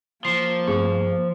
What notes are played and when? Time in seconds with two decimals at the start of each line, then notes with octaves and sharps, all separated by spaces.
0.25 F3 A#3 C7
0.68 G2 A3 C4 G#4